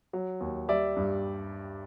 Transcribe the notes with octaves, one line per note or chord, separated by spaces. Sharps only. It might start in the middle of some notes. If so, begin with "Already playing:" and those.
F#3
D#2
G3 D5 E5
G2